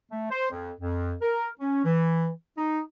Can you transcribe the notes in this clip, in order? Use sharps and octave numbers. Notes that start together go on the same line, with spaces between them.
A3
C5
F2
F2
A#4
C#4
E3
D#4